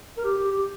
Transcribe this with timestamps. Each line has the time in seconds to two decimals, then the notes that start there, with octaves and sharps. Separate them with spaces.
0.17 A#4
0.24 G4
0.37 G4
0.51 G4